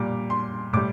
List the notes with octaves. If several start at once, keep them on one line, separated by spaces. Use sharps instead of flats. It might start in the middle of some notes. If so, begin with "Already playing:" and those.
Already playing: A#2 G3 A#5 D6
C6
A2 G3 D6